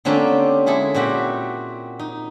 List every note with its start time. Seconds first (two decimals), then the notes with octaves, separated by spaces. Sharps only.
0.05 D3 A#3 C4 C#4 F4 G4
0.66 G#3 E4 G#4 A4
0.94 A#2 C4 F#4 G4
1.99 D#4